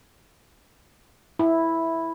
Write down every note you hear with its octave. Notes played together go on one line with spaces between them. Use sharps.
E4